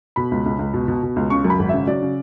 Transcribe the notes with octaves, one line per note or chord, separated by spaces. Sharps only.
B2 B5
C#2
C#2
C#2
B2
B2
B2
C#2
C#3 C#6
F#2
B5
G#1
C#3 E5
F#3 D5
C#3